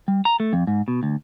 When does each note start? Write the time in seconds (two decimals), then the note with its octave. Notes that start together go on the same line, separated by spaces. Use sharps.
0.08 G3
0.25 A#5
0.40 A3
0.53 F2
0.67 G#2
0.88 B2
1.03 D2